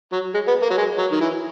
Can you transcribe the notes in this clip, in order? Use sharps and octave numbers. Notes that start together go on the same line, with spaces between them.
F#3
G#3
B3
A#3
F#3
G#3
F#3
D#3
E3